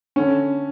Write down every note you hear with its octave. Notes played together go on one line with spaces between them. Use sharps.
D3 C#4